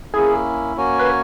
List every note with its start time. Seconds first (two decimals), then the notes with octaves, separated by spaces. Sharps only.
0.14 A#3 C#4 E4 G#4
0.77 A#3 C#4 F#4 C#5 G#5
0.99 B4